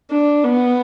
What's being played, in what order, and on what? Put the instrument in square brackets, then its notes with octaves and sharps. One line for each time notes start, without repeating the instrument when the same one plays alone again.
[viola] D4
B3